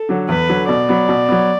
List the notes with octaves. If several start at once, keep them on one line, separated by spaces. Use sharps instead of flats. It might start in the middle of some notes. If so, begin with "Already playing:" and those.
Already playing: A4
D3 F#3
E2 B4
D3 F#3
B2 D5
F#3 B3
B2
F#3 B3